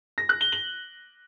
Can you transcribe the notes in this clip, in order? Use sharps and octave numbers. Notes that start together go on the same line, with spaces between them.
A#6
F#6
G7
F#7